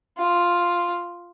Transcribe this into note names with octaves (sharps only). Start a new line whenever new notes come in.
F4